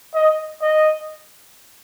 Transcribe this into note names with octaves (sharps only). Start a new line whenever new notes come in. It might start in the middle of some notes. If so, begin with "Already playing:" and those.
D#5
D#5